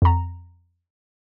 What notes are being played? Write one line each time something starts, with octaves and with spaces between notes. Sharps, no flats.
F2 A#5